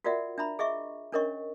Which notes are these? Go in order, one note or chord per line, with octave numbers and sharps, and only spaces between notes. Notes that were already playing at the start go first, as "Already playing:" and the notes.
F4 F#4 A#4 D5 E5 F#5
D4 E5 A#5 B5
G#4 D#5 E5 C#6
C#4 D4 A#4 C#5 D#5 C#6